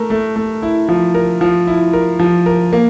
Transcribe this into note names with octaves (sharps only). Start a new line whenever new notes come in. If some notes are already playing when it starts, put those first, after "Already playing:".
Already playing: A3 A#4
A3
A3
E4
F3
A#4
F3
E4
A#4
F3
A#4
A#3